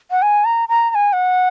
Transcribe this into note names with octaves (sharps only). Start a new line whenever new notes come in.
F#5
G#5
A#5
A#5
A#5
G#5
F#5